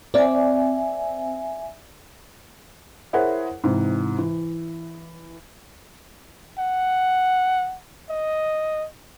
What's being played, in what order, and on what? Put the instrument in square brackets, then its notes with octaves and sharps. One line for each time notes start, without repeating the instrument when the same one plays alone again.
[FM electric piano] C4 [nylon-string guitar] D5 [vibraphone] E5 G#5
[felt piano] E4 G#4 A#4 C5 C#5 F#5
G#2 C3 E3
E3
[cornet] F#5
D#5